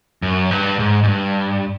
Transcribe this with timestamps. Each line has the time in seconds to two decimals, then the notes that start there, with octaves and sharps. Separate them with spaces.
0.22 F#2
0.51 G2
0.79 G#2
1.03 G#2
1.08 G2